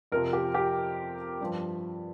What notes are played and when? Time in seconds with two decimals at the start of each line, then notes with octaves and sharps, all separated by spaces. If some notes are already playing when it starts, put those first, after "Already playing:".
0.12 F2 C3 F3 A#4
0.33 G4
0.54 G4
1.41 G2 F3